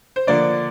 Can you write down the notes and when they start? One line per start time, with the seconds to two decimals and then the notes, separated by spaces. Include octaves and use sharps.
0.16 C5
0.27 D3 F3 A#3 D4 D5